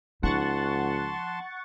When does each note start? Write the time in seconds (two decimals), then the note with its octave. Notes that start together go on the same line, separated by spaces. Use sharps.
0.23 C#2 F3 D#4 F#5 A5 C6 C#6 A6